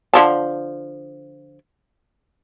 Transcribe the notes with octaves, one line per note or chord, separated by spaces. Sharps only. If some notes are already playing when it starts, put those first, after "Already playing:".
D3 F3 A5